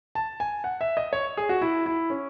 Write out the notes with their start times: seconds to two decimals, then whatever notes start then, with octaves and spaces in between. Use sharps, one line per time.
0.15 A5
0.40 G#5
0.64 F#5
0.81 E5
0.97 D#5
1.13 C#5
1.37 G#4
1.49 F#4
1.62 E4
1.86 E4
2.10 C#4